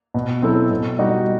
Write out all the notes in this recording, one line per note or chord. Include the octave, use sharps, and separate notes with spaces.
B2
F#3 C4 E4 A4
B2
G3 D#4 F#4